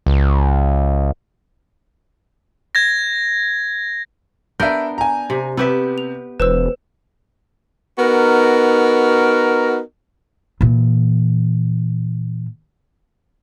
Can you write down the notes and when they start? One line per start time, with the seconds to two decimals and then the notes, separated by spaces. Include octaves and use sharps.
0.06 C#2
2.75 G#6 A#6
4.60 B3 D4 A#4 E5 G6
4.98 G#5 A#5
5.30 C3
5.57 C3 B3 G4 B4 E5 E6
5.98 F7
6.40 E1 B4 C5 E6 E7
7.99 B3 D#4 F#4 A#4
10.61 A#2 E3